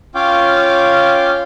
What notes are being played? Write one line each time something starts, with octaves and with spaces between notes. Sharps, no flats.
C#4 F4 C#5 F5 G5 D6